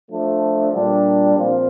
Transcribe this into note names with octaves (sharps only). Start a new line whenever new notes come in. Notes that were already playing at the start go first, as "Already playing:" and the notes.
F3 A3 D4
A#2 G3 D4
A#2 F3 C4 F4